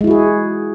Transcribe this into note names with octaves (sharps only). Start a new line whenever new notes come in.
G#3 E4 F#4 G#4